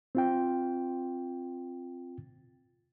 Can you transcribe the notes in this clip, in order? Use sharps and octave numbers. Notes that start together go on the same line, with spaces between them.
C4 F4 G5